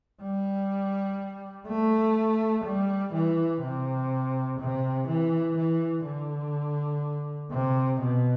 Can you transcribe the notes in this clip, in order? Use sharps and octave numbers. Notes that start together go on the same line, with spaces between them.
G3
A3
G3
E3
C3
C3
E3
E3
D3
C3
B2